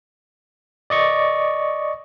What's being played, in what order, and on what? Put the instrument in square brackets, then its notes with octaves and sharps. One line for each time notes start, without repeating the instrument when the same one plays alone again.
[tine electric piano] D5 D#5 C#6